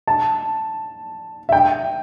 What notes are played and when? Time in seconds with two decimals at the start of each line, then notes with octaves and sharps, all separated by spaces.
0.08 A5
1.49 E5
1.52 G5